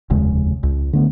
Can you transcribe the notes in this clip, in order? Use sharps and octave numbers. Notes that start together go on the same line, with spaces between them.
F1 D#2 C#3 G#3
C#2
D3 A3 B3